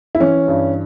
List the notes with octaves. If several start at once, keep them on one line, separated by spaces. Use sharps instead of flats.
E4
E3 C#4
G2